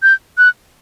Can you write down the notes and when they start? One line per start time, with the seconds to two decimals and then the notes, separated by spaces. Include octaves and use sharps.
0.03 G6
0.38 F#6